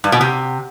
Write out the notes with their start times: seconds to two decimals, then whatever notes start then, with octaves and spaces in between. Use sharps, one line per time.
0.04 G2
0.12 B2
0.21 C3